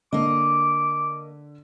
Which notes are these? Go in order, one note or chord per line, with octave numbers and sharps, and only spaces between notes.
D3 A#3 D#5 D6